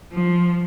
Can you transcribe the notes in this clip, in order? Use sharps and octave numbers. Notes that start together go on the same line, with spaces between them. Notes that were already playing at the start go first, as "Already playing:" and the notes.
F3